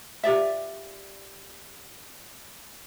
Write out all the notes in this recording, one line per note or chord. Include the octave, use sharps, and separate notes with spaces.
F4 G4 D5 E5